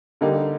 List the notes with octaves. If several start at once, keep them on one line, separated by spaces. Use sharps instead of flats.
D3 G3 A#3 D#4